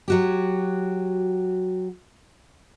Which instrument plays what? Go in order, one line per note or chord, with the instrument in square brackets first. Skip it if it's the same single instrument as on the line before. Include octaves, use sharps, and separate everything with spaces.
[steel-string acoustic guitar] F#3 F#4 G4